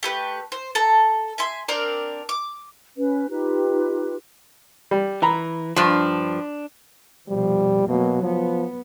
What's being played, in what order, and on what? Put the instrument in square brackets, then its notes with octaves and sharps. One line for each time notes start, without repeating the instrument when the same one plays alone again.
[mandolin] A3 G4 B4
C5
A4 A5 A#5
E5 G#5 C6
C4 D4 A#4 D5
D6
[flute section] C#4 B4
D#4 F4 G4 B4
[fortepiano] G3
[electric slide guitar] E3 [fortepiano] A#5 B5
[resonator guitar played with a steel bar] G2 F3 [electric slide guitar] D4
[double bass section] F1 B2 F3 [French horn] G3
[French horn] B2 [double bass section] F#3 A#3
[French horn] F3 [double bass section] B3